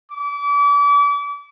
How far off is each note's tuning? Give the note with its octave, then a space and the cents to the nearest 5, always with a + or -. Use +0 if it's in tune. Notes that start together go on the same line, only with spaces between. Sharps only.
D6 -35